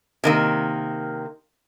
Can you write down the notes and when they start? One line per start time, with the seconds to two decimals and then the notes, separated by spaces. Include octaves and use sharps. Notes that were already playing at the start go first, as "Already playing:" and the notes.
0.24 C3 D#3 A#3